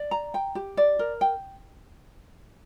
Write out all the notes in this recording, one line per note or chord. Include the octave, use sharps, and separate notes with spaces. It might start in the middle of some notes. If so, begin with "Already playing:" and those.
Already playing: D5
A#5
G5
G4
D5
A#4
G5